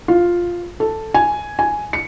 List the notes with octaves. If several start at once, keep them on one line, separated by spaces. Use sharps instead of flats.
F4
A4
G#5
G#5
C#7